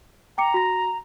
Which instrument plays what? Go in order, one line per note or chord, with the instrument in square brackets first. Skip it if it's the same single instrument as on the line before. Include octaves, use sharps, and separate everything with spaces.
[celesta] G5 D6 C#7 [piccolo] A#5
[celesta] F#4 A#6